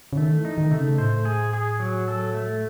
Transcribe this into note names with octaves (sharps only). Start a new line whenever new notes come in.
C#3
D#3 A3
E3
D#4
D#3
C3 A3
C#3
A2 C5
G#4
G#4
F#3
A4
A3